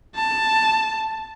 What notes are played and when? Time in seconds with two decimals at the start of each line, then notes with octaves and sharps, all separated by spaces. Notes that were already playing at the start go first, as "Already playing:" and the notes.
0.16 A5